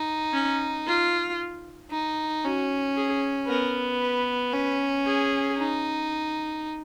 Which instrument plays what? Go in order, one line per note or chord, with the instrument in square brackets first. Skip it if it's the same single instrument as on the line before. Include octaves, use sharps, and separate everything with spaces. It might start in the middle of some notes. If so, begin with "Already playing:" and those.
Already playing: [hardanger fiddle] D#4
[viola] C#4
F4
[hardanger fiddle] D#4
[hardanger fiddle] C#4 [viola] F#4
[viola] G#4
[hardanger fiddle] B3 [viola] A#4
[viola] B4
[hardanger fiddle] C#4 [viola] B4
[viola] G#4
[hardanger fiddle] D#4